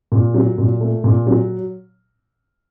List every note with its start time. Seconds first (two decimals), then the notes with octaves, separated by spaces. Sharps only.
0.12 A#2
0.34 F#3
0.58 A#2
0.80 A3
1.04 A#2
1.27 F#3